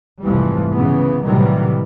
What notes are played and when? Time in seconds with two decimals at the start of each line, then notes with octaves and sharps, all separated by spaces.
0.24 F1 C2 G#2 E3 F3 G3
0.73 C#3 E3 B3
1.25 A2 C3 D#3 E3 F#3 G3